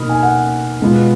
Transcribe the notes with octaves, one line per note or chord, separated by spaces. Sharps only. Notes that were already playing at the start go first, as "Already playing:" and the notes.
Already playing: B2 A#3 D#4 B5 D#6 F6
G#5
F#5
B2 G#3 B3 F4